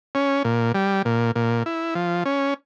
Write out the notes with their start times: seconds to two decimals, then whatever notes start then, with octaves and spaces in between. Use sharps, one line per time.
0.15 C#4
0.44 A#2
0.75 G3
1.05 A#2
1.35 A#2
1.66 E4
1.95 F3
2.25 C#4